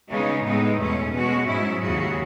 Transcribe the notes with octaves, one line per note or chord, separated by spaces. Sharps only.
C#3 G#3 B3 D#4
A2 G#3 B3 D#4
E2 B2 A3 C#4
B2 G#3 C#4 F#4
G#2 F#3 C#4 E4
D#2 C#3 F#3 C#4 F#4